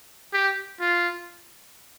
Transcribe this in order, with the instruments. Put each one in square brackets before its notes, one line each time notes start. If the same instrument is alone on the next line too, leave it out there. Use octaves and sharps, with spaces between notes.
[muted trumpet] G4
F4